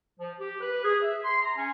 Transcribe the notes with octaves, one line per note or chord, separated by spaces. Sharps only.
F3
G4
B4
G#4
E5
C6
A#5
C#4